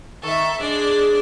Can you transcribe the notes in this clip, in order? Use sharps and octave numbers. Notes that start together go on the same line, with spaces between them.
D#3 A4 E5
G#3 D4 D5